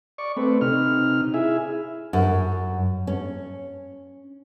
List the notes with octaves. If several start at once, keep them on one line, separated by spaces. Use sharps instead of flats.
D5 C#6
A3 C4 B4
C3 D#4 F6
E4 G#4 E5
F#2
C#4